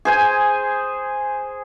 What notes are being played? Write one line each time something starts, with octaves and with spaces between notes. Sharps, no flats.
G#4 C5 G#5